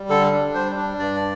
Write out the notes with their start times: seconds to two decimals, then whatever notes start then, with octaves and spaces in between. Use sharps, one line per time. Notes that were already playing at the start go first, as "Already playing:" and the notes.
Already playing: G3
0.09 D3 A4
0.32 D4
0.54 G3 C5
0.77 D4
0.99 G2 D5